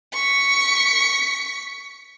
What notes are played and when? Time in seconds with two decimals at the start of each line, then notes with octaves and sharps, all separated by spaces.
0.14 C#6 B6